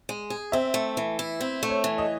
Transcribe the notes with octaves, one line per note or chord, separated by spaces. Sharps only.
G#3
G#4
C4 E5
A3
E3
E4
C4
A3
C#5
E3
D#5